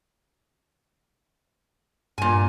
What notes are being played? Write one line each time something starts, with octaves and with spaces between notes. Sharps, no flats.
G2 A#2 G#5